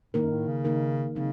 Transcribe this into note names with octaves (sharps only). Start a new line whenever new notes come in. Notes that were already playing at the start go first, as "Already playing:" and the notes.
A2 D#3 A#3 D#4 A#4
F#2
A2
C#3
D#3 A#3 D#4 A#4
C#3 F#3 C4 D#4